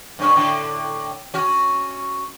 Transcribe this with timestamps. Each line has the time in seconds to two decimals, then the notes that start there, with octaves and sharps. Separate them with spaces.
0.19 G2 C#4
0.36 A2 D3
1.34 C#4 F#4